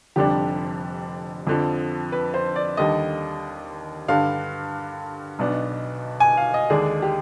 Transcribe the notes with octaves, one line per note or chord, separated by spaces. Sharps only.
F1 F2 D3 G3 D4 G4
F2 D3 F3
B4
C5
D5
D#2 D3 G3 D#5
G2 D3 G3 F5
B1 B2 B3 D4
G#5
F5
D#5
D#2 D3 G#3 D4 G#4
G4